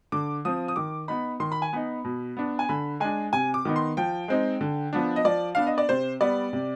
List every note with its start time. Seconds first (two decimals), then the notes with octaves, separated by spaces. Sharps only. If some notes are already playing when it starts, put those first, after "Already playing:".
0.12 D3 D6
0.45 F3 C4 D#6
0.68 D#6
0.76 D#3 D6
1.08 B3 D#4 B5
1.40 D#3 C6
1.52 B5
1.62 G#5
1.73 B3 D#4 B5
2.05 B2
2.37 B3 D4
2.59 G#5
2.69 D3 B5
3.00 G#3 D4 G#5
3.33 C3 G#5
3.54 D6
3.65 D#3 B3 D#4
3.76 C6
3.97 F3 G5
4.28 G#3 C4 D#4
4.61 D3
4.93 F3 B3 D4
5.16 D#5
5.25 F3 D5
5.55 B3 D4 F5
5.67 D#5
5.78 D5
5.89 C3 C5
6.21 G3 B3 D5
6.53 C3